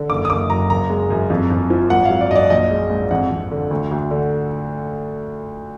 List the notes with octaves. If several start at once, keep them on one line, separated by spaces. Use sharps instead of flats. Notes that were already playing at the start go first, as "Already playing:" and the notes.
Already playing: D3
F#1 D6
D#6
F#1 D6
F#2 A#5
F#1 A#5
G#3
F#2
F2
F2
F3
G#1 F#5
F#3 F5
D5
F#2 D5 D#5
A#1 D#5
G#3
G#2
F2 F#5
F2
D3
D2
D2
D3